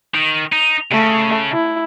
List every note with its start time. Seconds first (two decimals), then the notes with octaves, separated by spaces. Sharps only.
0.15 D#3
0.53 D#4
0.92 C#3 A3
1.52 E4